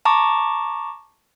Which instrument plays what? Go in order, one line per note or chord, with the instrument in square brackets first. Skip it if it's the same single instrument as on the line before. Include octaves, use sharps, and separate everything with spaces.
[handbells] A5 A#5 C#6 D6